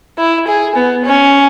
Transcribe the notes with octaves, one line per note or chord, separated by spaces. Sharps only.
E4
G#4
B3
C#4